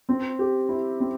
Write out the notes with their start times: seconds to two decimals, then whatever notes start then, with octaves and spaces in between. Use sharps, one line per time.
0.09 C4
0.39 G4
0.69 E4
1.00 C4